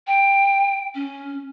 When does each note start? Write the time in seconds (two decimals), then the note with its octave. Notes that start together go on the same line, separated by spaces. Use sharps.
0.07 G5
0.95 C#4